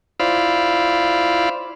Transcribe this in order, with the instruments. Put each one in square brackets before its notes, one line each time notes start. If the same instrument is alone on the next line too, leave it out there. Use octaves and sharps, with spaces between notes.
[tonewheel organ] E4 F4 C5 D5 F5 B5